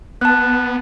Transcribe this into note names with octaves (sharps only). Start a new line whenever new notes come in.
B3 A5 F#6